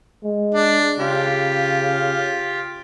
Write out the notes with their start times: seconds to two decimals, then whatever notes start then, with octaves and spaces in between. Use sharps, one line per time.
0.24 G#3
0.54 D4
0.99 C#3 F4 G4